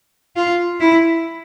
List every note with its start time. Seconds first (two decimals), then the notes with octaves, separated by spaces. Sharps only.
0.36 F4
0.80 E4